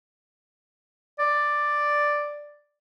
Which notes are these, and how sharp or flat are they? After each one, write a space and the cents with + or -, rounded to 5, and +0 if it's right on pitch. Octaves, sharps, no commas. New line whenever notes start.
D5 +5